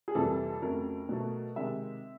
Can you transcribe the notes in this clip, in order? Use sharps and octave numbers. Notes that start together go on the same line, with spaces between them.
G#4
F2 C3 E3 G3 A#3 A4
F2 C#3 F#3 A3 A#4
B2 F#3 A3
C3 D#3 G#3 E5